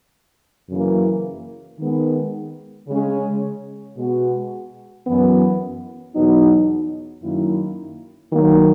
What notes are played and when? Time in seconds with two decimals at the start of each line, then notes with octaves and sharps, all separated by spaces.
0.70 F#2 C#3 E3 A#3
1.79 D#3 G#3 B3
2.88 C#3 G#3 C#4
3.97 B2 G#3 B3 F#4
5.05 F#2 E3 B3
6.15 E2 B2 F#3 B3 D#4
7.23 F#2 D#3 A#3 E4
8.32 D#3 F#3 A#3